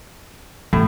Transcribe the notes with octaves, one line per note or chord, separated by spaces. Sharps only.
A1 A2